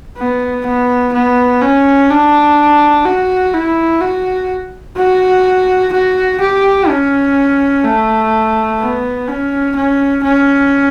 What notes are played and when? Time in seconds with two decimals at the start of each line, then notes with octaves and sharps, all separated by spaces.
0.18 B3
0.66 B3
1.14 B3
1.61 C#4
2.10 D4
3.05 F#4
3.54 E4
4.01 F#4
4.97 F#4
5.93 F#4
6.41 G4
6.89 C#4
7.85 A3
8.80 B3
9.28 C#4
9.76 C#4
10.24 C#4